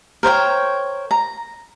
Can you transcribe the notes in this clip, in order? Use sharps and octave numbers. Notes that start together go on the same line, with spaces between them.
A#4 C5 C#5 G5
A#5